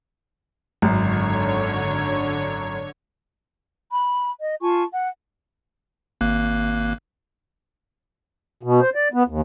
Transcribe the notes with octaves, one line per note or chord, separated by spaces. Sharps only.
G#1 F#2 D3 C#5 G#6
B5
D#5
F4 G#5 A5 C#6
F#5
G#1 A#3 F#6
B2
C5
D5
B3
D#2